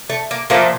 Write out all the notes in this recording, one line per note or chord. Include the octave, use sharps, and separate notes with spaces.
A3
A#3
A#2 F3 A3 A#3